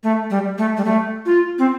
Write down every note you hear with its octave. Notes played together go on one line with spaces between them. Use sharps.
A3
G3
A3
G3
A3
F4
C4